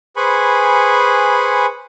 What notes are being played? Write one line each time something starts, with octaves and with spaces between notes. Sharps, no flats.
G#4 B4 C5 G#5 B5 C#6